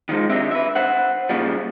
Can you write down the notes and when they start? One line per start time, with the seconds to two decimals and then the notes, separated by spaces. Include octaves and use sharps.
0.09 D#3 F3 G#3 D#4
0.30 C4 D4 G4 D#5 E5
0.51 B4 E5
0.76 C5 F#5
1.29 A#2 C#3 F3 G3